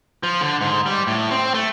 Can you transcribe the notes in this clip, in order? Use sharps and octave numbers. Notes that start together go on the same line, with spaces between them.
F3
D3
G#2
G3
A2
C4
A3